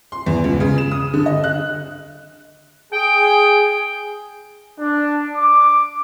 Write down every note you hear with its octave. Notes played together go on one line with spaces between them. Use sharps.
C6
E2
C#2
C#3
E7
D#6
D3
D#5
F#6
G#4 G5
D4
D6